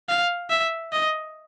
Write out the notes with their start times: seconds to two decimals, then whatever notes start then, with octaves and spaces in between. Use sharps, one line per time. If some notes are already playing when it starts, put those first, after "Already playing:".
0.09 F5
0.50 E5
0.92 D#5